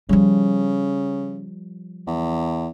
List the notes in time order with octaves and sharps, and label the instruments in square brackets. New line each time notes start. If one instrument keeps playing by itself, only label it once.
[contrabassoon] C#3 [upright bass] F3 G3
[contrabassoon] E2